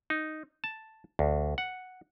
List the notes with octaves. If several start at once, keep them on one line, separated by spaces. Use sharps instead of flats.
D#4
A5
D2
F#5